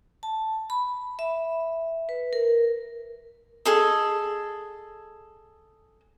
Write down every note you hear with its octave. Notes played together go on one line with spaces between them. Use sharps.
A5
B5
E5
B4
A#4
G#4 A4 D#5